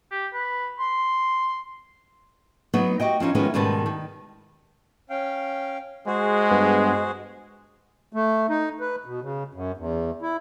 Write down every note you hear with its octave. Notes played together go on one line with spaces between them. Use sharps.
G4
B4
C6
F#3 B3 D#4
F#4 G4 D#5 G5
F3 C4 C#4 D#4
D#3 F3 G#3 A3 B3 C#4
G#2 B2 D#3 G3 B4 A5
D#3
C#4 F5 G5
G#3 F#4 G#4 C5
G2 B3
A3
D#4
B4
B2
C#3
F#2
E2
E4